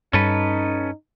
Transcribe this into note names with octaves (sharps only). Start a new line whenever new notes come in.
G2 G3 C#4 D#4 A4 B4